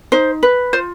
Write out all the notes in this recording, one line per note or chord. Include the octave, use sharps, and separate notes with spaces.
D#4 C5
B4
F4 C5